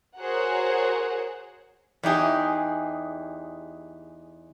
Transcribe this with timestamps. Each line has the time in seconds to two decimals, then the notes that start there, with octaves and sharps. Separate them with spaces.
0.18 F#4 G#4 A#4 C5 C#5 F#5
2.03 E2 D#4 G4 G#4